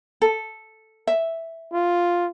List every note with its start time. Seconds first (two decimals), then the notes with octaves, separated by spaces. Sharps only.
0.22 A4
1.07 E5
1.73 F4